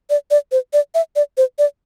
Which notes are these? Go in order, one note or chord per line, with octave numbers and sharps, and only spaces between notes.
D5
D5
C5
D5
E5
D5
C5
D5